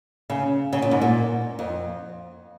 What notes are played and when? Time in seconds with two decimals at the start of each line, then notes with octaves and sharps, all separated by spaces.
0.30 C#3
0.73 C#3
0.82 A#2
0.91 G#2
1.01 A#2
1.59 F2